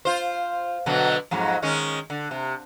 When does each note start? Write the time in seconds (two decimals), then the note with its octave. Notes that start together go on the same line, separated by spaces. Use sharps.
0.05 F4 C5
0.86 B2 D3 F#3
1.31 F2 G#2 F#3
1.62 D#3 G#3 C#4
2.10 D3
2.31 C3